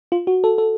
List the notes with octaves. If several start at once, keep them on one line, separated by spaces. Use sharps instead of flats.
F4
F#4
A4
A4